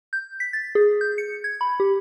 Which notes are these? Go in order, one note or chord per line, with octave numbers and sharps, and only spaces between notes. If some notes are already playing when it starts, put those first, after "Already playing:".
G6
B6
A6
G#4
G6
C#7
G#6
B5
G4